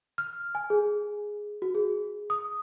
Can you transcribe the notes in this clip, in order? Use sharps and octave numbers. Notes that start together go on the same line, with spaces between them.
F6
G#5
G#4
F#4
G#4
D#6